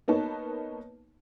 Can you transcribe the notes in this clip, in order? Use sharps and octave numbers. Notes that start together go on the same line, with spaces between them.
A#3 B3 D#4 B4 C#5 A5